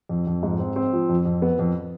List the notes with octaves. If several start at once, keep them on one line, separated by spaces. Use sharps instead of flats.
F2
F2
G#2
C4
C4
F3
F2
F2
B3
F2